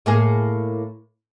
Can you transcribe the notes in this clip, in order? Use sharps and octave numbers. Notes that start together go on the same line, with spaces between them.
A2 A#3 G#4